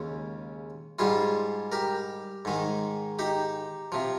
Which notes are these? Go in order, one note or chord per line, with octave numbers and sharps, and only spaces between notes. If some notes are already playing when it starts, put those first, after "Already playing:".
Already playing: D#2 C#3 G#3
G#2 G3 F4 G#4
G4 A#4
G#2 D#3 G#3
D#4 G4
C3 F3